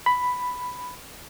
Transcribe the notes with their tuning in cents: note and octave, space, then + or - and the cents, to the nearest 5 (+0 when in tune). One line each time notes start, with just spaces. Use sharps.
B5 +5